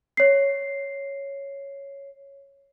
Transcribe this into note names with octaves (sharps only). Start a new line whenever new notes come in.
C#5 C7